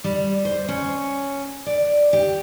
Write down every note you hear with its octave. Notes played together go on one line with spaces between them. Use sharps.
G3
C5
C#4
D5
G4